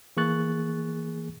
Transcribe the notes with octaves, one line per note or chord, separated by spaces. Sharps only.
E3 A#3 G#4 C#6 F#6 A6